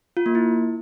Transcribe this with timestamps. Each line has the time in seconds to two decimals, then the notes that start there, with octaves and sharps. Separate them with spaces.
0.17 F4
0.26 A#3
0.35 E4